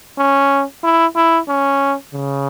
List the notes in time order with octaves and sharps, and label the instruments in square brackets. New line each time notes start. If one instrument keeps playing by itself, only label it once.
[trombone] C#4
E4
E4
C#4
C#3